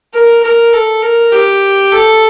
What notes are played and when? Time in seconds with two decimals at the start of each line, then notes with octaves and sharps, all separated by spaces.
0.14 A#4
0.43 A#4
0.73 A4
1.03 A#4
1.32 G4
1.92 A4